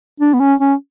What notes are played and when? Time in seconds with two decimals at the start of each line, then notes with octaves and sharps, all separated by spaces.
0.20 D4
0.34 B3
0.40 C#4
0.60 C#4